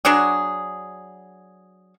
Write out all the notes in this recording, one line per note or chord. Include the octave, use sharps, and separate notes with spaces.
F#3 D4 F#4 G#4